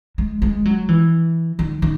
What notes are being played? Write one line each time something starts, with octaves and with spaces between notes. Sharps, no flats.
G#3
G#3
F#3
E3
D#3
D#3